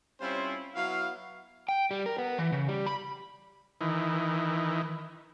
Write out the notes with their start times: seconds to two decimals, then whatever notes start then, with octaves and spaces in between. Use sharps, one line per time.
0.21 G3 C4 C#4 E4 F4 C5
0.75 F#3 B3 E4 F5
1.69 G5
1.91 G3
2.06 A#4
2.18 B3
2.38 E3
2.52 C#3
2.68 G3
2.86 B5
3.81 D#3 E3